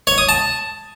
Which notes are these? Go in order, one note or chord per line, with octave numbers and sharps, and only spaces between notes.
C#5
D#6
A5